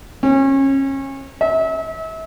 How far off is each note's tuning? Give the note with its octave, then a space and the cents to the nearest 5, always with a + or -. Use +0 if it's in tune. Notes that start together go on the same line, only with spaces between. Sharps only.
C#4 -30
E5 -35